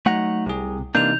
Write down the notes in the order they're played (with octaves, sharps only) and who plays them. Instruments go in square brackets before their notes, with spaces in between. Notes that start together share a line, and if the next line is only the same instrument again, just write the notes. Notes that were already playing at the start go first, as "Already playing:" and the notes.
[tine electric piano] F#3 D#4 A#5 [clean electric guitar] A3 F#5
[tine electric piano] C2 G#4 [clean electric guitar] C3
[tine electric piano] C3 E3 D#4 [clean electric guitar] A#3 D4 [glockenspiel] G6 F7